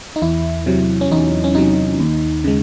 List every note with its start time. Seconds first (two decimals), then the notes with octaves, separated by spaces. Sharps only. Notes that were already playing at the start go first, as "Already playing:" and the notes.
0.16 D#4
0.22 E2 E4
0.66 C3 F#3
1.01 C#4
1.11 E2 D#4
1.44 C#4
1.55 C3 F#3 D#4
2.00 D#2
2.44 C#3 G#3